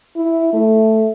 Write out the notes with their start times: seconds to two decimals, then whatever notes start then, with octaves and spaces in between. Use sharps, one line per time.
0.16 E4
0.53 A3